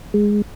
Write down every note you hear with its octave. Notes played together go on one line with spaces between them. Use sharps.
G#3